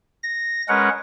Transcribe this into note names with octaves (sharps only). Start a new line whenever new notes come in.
A#6
G#3 C#4 A#4 B4 F#5